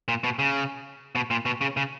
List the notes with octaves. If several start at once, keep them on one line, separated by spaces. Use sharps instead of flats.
A#2
B2
C#3
B2
A#2
B2
C#3
C#3